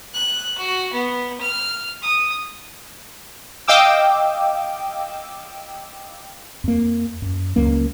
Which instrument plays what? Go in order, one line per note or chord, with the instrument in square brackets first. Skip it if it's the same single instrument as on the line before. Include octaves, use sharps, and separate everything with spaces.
[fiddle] F#6
F#4
B3
F6
D#6
[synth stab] D#5 F5 G5 D6 E6
[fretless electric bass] F2 A#3
F#2
C#2 F#3 A#3 C#4